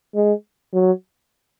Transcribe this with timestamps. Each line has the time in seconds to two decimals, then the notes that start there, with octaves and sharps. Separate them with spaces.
0.14 G#3
0.73 F#3